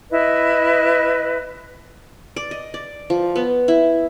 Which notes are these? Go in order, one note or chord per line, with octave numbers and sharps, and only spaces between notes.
E4 B4 D#5
D5
D#5
D5
F3
B3
E4